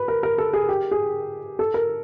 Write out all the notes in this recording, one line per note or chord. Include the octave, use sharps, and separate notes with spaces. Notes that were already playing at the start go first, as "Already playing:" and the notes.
Already playing: B4
A#4
A#4
A4
G#4
G4
G#4
A4
A#4